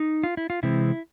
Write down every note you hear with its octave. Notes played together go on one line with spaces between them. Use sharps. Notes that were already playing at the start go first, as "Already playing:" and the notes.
Already playing: D#4
F4
E4
F4
C3 E3 G#3 C4 E4